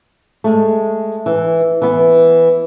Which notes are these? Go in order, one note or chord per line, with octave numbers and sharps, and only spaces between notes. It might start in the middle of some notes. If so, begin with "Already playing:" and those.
G#3 A3
E3
E3 B3